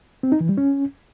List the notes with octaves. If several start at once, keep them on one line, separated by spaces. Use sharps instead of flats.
C4
D#4
E3
G3
C#4